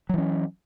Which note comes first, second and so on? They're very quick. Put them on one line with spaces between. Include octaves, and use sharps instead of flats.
F#3 E3 C#4